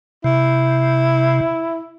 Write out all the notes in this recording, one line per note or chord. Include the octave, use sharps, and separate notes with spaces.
C3 E4